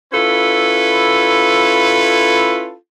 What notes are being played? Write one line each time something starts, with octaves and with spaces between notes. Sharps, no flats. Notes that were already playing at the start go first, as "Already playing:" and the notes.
C#4 E4 F4 A4 B4